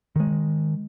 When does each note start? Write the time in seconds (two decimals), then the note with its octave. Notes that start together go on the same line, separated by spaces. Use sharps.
0.16 D#3 G#3